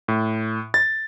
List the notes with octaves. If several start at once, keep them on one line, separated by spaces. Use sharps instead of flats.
A2
A6